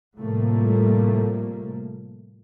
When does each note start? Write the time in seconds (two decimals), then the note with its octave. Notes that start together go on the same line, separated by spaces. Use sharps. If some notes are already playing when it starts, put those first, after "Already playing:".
0.18 A2 C3 F3 G3 A3 A#3